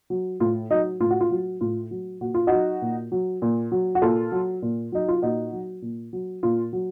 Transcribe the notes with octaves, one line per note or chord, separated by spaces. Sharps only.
F#3
A2 F4
F#3 D#4
A2 F4
F#4
F4
F#3
A2 F4
F#3
A#2 F#4
F4
F#3 D#4 F#4
A#2
F#3
A#2
F#3
F#4
A#2 F4 A4
F#3
A#2
F#3 D#4
F4
A#2 D#4 F#4
F#3
A#2
F#3
A#2 F4
F#3